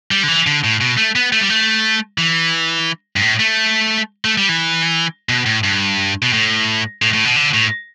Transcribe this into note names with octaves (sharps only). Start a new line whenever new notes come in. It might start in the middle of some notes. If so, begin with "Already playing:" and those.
G3
D3
E3
D3
A2
B2
A3
B3
A3
G3
A3
E3
G2
A2
A3
A3
G3
E3
B2
A2
G2
B2
A2
A2
A2
B2
D3
A2